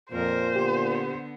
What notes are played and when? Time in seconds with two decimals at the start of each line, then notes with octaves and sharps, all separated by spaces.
0.12 F2 A#2 A#4 C5
0.56 D3 B3 G4